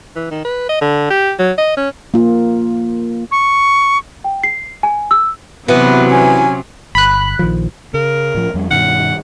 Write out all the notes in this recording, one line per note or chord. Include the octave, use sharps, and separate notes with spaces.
E3
D#3
B4
D#5
D3
G4
F#3
D#5
C#4
A#3 F4
C#6
G5
C7
G#5
E6
C3 E3 F#3 B3 F#4 B4
C#4 G#5
G1 B5 F#6
A#1 D#3 F3
C#3 A#4
A2 F3
F2 G3
G2 B2 D#3 F#5